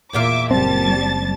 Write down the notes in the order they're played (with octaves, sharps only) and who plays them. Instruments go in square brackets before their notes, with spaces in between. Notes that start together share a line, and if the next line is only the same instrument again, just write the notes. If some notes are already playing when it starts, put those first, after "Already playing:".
[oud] E2 A#2 F5 [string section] E5 D6
[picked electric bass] F#1 C4 [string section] G3 A5 A6